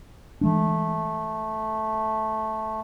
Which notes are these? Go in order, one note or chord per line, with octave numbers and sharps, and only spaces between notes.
E3 G#3 A3 D4